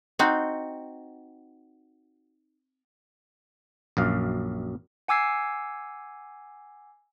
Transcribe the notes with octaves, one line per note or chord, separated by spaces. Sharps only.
C4 D#4 F#4
A#1 F#2 F5
F#5 G#5 D6 E6 G#6 C7